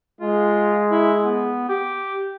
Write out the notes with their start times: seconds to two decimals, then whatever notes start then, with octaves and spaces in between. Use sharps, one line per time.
0.21 G#3 F4
0.91 E4
1.24 B3
1.69 G4